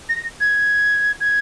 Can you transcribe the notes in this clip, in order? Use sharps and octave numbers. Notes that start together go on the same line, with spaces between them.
A#6
G#6
G#6